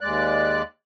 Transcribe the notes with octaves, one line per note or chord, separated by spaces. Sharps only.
D#2 G#3 D5 F#6